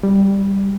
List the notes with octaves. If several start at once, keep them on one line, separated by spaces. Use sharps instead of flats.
G3